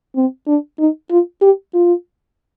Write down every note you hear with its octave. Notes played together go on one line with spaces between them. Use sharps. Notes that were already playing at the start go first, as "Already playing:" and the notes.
C4
D4
D#4
F4
G4
F4